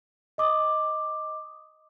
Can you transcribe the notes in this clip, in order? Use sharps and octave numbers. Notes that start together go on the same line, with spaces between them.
D#5 D6 D#6